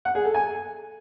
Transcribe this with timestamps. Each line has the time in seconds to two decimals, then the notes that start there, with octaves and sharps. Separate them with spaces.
0.05 F#5
0.15 G#4
0.25 A4
0.34 G#5